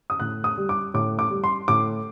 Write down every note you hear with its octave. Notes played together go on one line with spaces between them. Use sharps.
D#6
A2 F#6
D#6
G3
D6
A2 D6
D6
G3
C6
A2 D6